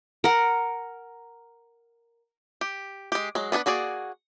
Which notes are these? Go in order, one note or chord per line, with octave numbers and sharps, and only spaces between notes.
A#4 F#5
G4
G#3 G4
F#3 G#3
B3 D4 G#4 B4
A#3 F#4 G#4 D5